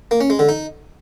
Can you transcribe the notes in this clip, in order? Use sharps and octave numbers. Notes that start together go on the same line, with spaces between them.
A#3
C#4
G#3
D3
D#4